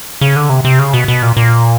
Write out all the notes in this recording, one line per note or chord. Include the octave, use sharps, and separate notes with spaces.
C#3
D3
C3
C3
C#3
B2
B2
A#2
A#2